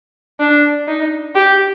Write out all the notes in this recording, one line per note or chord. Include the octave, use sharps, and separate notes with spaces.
D4
D#4
G4